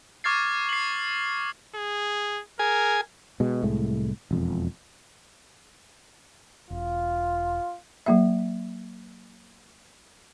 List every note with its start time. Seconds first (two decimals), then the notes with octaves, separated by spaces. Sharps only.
0.24 C#6 D6 F6 G#6 A6 C7
0.69 C7 F#7
1.76 G#4
2.59 G#4 A#4 G#5
3.40 B2 G#3
3.62 C2 A2 G#3 A3
4.31 E1 F2
6.70 E1 F4
8.06 F#3 A#3 E5